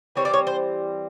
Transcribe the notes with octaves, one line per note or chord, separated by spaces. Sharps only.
E3 G3 C4 C#5
D5
C#5
C5